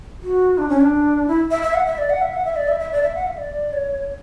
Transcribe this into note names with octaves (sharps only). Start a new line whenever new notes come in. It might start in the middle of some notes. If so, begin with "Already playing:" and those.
F#4
D4
C#4
D4
E4
E5
E5
F#5
E5
D5
F#5
E5
F#5
E5
D5
E5
E5
D5
E5
F#5
E5
D5
C#5